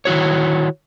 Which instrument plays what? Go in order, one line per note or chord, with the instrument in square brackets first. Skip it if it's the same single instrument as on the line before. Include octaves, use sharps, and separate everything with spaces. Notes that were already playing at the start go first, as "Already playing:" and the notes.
[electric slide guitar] D#3 E4 F#4 C#5